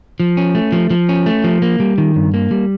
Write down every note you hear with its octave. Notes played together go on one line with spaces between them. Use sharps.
F3
C#4
A3
F3
F3
C#4
A3
F3
A#3
G3
D#3
G2
A#3
G3